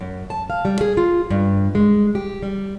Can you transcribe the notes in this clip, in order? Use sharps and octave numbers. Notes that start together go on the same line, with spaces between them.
F#2
A5
F5
G3
G#4
F4
G2
G#3
G4
G3